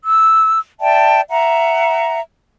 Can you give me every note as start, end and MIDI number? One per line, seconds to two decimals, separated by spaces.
0.02 0.58 88
0.80 1.21 74
0.80 1.21 76
0.80 1.21 79
0.80 1.21 81
1.29 2.21 76
1.29 2.21 78
1.29 2.21 82